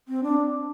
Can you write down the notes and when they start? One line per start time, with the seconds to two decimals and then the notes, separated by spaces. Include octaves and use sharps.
0.08 C4
0.23 D4